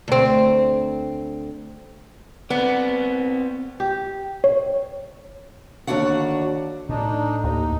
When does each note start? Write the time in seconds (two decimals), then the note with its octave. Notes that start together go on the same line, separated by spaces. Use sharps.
0.08 D2 C4
2.50 B3 C4 D5
3.80 G4
4.44 C#5
5.87 D#2 D3 D4 F#4 F#5
6.89 A2 D4 D#4
7.44 D#2 D#4